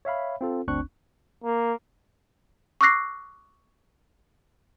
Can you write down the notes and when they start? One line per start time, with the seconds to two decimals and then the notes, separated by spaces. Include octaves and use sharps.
0.05 C#5 E5 F5 B5
0.41 C4 F4 A4
0.68 G1 D2 C4 D4 C#6 F#6
1.44 A#3
2.81 C#6 D6 E6 F#6 A#6 C7